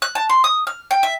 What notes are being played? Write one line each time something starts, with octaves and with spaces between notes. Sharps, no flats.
F#6
A5
C6
D#6
F6
G5
E5